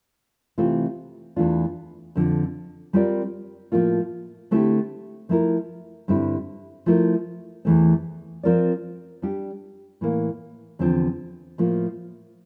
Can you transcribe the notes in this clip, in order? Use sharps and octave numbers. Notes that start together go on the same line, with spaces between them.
C3 E3 A3 C4 F4
E2 E3 A3 D4 F4
F2 D3 F3
G3 C4 F4 A#4 D5
A2 F3 A#3 F4
D3 A3 C4 E4 G4
F3 A3 E4 A#4
G2 D3 G3 C4 E4
F3 A3 E4 A#4
E2 E3 A3 C4
F3 C4 F4 A#4 D5
G3 D4 G4
A2 E3 A#3
E2 D3 F3 C4
A2 F3 A#3